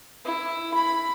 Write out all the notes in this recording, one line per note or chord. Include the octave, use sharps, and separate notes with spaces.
E4
B5